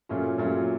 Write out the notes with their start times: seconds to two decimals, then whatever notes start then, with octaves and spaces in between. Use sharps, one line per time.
0.09 A#2 F#3 A3 C#4 F4
0.38 A#2 F#3 A3 C#4 F4